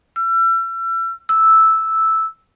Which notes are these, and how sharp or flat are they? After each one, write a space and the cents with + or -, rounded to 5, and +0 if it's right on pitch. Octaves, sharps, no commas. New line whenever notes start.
E6 +40
E6 -5